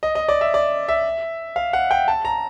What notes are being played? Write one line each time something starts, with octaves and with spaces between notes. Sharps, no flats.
D#5
D#5
D5
E5
D5
E5
F5
F#5
G5
A5
A#5